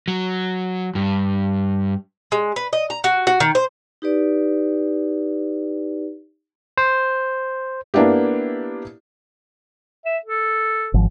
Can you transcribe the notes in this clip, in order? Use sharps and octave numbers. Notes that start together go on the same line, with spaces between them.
F#3
G2
G#3
B4
D#5
A#5
F#4
F#4
D#3
C5
D#4 G4 B4 D5
C5
A#3 B3 D4 E4 G4
E5
A4
G#1 F3